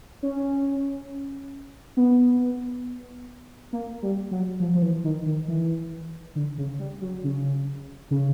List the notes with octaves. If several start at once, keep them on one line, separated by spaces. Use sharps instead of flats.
C#4
B3
A#3
G3
F#3
F3
F3
E3
D#3
D#3
E3
D3
C#3
G3
F#3
C#3
C#3